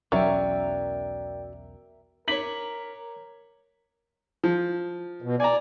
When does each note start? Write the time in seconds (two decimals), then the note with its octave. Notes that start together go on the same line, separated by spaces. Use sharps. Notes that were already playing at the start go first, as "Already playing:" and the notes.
0.12 B1 E2 F#3 C#4 A#4 D5 E5 G5
2.28 A#4 C#5 D6 B6 F#7
4.44 F3
5.22 B2
5.40 D5 G#5 A#5